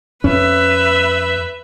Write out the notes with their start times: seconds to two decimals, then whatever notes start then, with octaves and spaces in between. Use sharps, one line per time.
0.24 F2 C#4 B4 E5